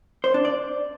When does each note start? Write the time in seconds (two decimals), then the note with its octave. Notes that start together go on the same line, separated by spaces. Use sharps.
0.24 C5
0.34 D4
0.45 D5